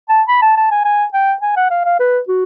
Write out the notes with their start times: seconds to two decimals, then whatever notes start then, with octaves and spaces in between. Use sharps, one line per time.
0.09 A5
0.28 B5
0.42 A5
0.56 A5
0.71 G#5
0.85 G#5
1.13 G5
1.42 G#5
1.56 F#5
1.71 F5
1.85 F5
2.00 B4
2.28 F#4